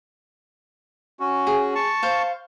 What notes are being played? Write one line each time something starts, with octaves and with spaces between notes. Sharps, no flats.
C#4 F#4
G#4
A5 C#6
C5 F5